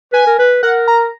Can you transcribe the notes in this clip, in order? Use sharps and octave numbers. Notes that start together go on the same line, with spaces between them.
B4 G#5
A#4
B4
A#4 F#5
A#5